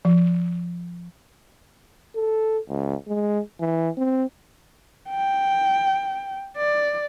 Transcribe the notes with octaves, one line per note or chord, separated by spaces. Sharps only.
F3
A4
C#2
G#3
E3
C4
G5
D5